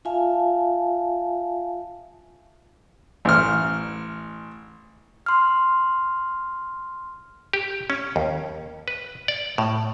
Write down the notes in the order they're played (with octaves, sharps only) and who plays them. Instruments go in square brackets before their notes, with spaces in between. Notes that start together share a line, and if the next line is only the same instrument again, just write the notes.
[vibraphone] F4 E5 F5 G#5 A5
[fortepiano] A1 F6
[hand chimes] C6 F6
[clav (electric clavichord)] G4
C#4
D#2
B4
D5
A2